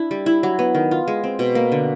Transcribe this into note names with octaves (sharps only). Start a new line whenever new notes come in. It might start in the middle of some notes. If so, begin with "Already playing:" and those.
Already playing: D4 E4
G3
E4
F#3
B3
D#3
F4
G#3
C4
B2
A#3
D3